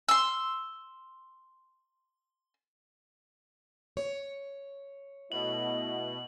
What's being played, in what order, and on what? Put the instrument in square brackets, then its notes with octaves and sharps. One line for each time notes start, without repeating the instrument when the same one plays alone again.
[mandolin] C6 E6
[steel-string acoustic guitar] C#5
[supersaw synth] B2 [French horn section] A3 E4 D#5 [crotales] F#7